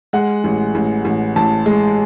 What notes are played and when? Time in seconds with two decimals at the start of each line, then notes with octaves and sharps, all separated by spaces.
0.13 G#3 F#5
0.44 A1
0.75 A1
1.05 A1
1.36 A1 A5
1.66 G#3